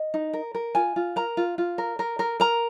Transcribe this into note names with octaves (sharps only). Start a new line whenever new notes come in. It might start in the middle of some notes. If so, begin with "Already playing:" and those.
Already playing: D#5
D#4
A#4
A#4
F4 G#5
F4
A#4 A#5
F4
F4
A#4
A#4
A#4
A#4 A#5